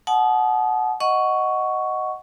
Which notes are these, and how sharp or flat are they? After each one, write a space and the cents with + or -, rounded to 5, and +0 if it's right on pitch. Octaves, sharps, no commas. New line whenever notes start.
F#5 +0 A5 -35 D#6 -10
D#5 +0 F#5 +0 C#6 +10